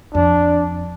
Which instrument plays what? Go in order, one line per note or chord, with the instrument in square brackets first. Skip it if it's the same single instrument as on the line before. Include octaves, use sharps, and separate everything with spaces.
[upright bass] F2 [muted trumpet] D4